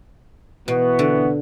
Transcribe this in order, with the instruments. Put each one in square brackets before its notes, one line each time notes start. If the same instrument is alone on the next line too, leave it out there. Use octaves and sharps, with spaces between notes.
[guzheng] B2 [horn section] E3 B3 F#4
[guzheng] D3